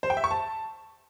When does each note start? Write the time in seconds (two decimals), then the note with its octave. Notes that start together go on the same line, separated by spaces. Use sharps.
0.03 C5
0.10 G5
0.17 E5
0.24 C#6
0.31 A5